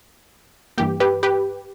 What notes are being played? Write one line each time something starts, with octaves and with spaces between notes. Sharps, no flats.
G2 E3 A#3 G4
G4 B4
G4 B4